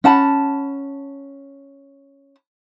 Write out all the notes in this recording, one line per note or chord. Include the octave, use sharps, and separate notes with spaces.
C#4 F#5 A5 B5